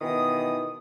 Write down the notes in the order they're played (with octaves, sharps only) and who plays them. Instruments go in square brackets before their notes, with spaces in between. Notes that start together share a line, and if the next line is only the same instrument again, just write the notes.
[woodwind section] B2 D#3 E3 B3 D#6